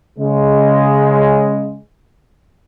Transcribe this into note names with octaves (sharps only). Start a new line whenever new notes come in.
C#3 G#3